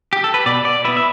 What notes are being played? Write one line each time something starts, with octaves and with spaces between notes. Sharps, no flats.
G4
A4
B4
B2 D5
D5
B3 E4 B4
E5